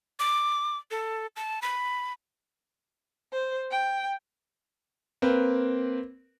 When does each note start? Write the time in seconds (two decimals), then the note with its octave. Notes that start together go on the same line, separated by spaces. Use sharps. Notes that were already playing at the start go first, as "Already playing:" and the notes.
0.19 D6
0.91 A4
1.36 A5
1.62 B5
3.32 C5
3.70 G5
5.22 A#3 C4 A#4 B4